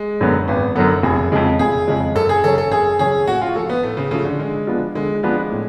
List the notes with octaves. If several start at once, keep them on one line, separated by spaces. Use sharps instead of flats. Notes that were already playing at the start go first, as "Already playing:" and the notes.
Already playing: G#3
F#2 D3 F#3 B3
G#1 B3
F#2 D3 F#3 B3 A4
F1 G#4
F2 C#3 G#3
F1 G#4
F2 C#3 G#3
F#2 A4
G#4
C#3 F#3 C#4 A4
A4
F#2 G#4
C#3 F#3 C#4 G#4
A2 F#4
F4
F3 A3 F4 A4
B3
A2 A3
C#3
C#3 F3 A3 F4
D3
D3 G#3
F3 B3 D4 F4
D3 G#3
F3 G#3 B3 D4 F4
A2